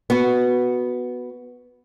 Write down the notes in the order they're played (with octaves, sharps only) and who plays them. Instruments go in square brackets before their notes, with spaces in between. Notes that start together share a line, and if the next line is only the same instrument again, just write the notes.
[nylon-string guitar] B3 F#4